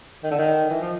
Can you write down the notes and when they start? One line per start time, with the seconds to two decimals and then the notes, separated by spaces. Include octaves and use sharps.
0.24 D#3
0.31 D3
0.39 D#3
0.70 E3
0.81 F3